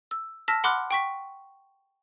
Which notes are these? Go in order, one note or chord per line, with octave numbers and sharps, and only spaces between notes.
E6
A5 E6 F6 A#6 B6
F#5 B5 C6 D6 F6 F#6
G5 C#6 B6